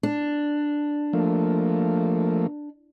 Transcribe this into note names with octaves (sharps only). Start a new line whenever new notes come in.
D4
F3 A3 A#3